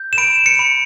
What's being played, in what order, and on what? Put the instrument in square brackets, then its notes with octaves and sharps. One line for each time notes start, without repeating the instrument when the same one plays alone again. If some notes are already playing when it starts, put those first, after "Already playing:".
Already playing: [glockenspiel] G6
E7
B5 D7
C#7
B5